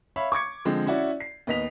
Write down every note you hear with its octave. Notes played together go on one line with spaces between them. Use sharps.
C#5 E5 F5 B5
C#6 D6 G#6 C#7
D3 F3 G#3 C4
C#4 E4 F#4 D5
C7
D#2 B3 D#5 B6 F7